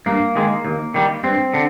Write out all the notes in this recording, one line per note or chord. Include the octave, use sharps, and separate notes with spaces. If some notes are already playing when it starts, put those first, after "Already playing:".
G2 A#3
D#3 G#3
D#2
D#3 G3
G2 C4
D3